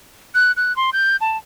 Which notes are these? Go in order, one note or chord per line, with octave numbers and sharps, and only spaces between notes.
F#6
F#6
C6
G6
A5